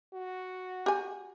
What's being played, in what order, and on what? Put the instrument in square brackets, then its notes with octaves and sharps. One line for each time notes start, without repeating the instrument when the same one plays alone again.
[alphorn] F#4
[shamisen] G4 G#5